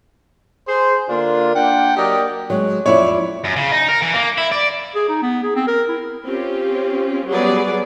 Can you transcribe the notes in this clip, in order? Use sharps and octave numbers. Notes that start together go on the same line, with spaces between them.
G#4 C5
D3 A#3 D4 F4
A#3 D4 F#5 G5
F#3 A#3 G4 A#4 D5 D#5
F#3 G#3
F2 E4 C#5 D5
F#2
C#3
D#4
A#4
E3
A#3
E4
D5
G#4
D#4
B3
G#4
C4
A#4
E4
C4 C#4 F4 G4
F#3 G3 B3 G#4 B4 D5